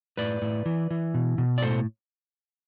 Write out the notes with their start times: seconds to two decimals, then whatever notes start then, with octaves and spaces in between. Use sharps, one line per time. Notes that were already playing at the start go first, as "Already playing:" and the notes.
0.17 A2 B4 D5
0.42 A2
0.66 E3
0.91 E3
1.14 B2
1.38 B2
1.58 D5
1.62 A2 A4 C5